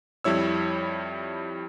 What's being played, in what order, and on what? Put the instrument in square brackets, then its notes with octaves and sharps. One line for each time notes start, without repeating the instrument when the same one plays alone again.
[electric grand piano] F2 G3 E4 C#5 E6